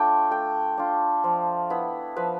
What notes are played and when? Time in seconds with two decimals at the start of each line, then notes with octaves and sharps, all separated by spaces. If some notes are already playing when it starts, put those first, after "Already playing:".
Already playing: A3 D4 F4 G5
0.31 A3 G5
0.78 D4 F4
1.24 F3
1.70 B3 E4
2.16 F3 B4